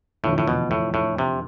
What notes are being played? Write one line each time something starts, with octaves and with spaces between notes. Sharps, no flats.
F1 E2 A2 D3 F3
A2
B2
A2
A2
C3